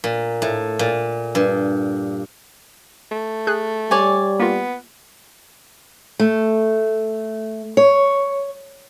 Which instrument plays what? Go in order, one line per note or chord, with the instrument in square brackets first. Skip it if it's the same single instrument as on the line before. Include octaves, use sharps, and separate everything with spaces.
[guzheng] A#2
A2
A#2
G2
[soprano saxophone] A3
[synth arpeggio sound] G#4 F#6
[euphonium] G3 [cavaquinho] C#5 D5 G#5
[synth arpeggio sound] A#3 F4 [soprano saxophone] B3
[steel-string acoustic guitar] A3
C#5